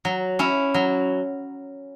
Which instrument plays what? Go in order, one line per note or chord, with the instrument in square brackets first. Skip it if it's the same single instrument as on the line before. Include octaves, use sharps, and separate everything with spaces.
[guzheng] F#3
C#4 E4
F#3